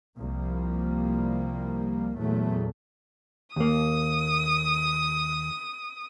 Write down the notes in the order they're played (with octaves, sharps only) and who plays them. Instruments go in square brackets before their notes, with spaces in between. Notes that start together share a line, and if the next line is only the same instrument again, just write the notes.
[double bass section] C2 F3 G3 A#3
E2 A#2 F#3 A3
[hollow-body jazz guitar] D#2 A#3 [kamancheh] D#6